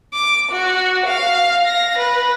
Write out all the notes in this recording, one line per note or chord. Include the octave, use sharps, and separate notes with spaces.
D6
F#4
F5
A#6
B4